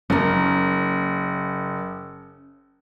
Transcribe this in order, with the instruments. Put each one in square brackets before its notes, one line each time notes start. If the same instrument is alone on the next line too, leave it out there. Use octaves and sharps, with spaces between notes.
[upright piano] F#1 [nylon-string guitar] C#4 A#4